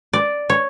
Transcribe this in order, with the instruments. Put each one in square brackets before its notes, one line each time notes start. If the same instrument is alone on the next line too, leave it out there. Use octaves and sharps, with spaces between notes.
[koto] D5
C#5